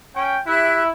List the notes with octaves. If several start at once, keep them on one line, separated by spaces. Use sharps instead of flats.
C#4 G5
E4 G4 E5 F#6